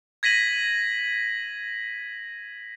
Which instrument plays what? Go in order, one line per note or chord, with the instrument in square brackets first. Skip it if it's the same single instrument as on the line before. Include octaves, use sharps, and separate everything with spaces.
[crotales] G#6 A#6 B6 D#7 F#7